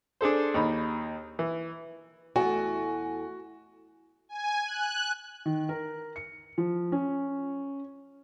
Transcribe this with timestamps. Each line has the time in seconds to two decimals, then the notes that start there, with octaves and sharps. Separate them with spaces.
0.21 D4 G#4 A4 C5
0.54 D#2 D#4 B5
1.39 E3
2.36 E2 A3 F#4 G#5
4.29 G#5
4.65 F#6
5.46 D#3
5.69 A#4
6.16 C#7
6.58 F3
6.92 C#4